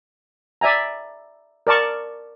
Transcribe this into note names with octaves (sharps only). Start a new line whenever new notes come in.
D5 E5 G#5 A#5
A#4 D5 A5 C#6